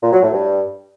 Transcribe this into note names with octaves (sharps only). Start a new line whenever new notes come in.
A#2
F#3
A2
G2